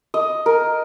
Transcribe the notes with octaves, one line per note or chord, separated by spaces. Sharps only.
D#5
A#4